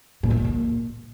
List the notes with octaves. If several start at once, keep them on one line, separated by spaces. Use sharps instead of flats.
A#2
E2
B2
A#2